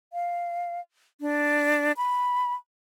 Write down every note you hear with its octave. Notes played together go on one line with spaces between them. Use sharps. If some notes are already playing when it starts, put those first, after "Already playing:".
F5
D4
B5